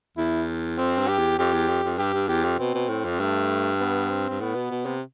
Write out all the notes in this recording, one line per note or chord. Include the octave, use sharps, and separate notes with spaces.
E2 E4
F2 C4
G2
G4
E2
F2 G4
E2
F2
F2
G2 G4
G2
E2 G4
F2
B2 C4
B2
A2
F2
G2 A3
B3
C4
G2
A2 B3
B2
B2
C3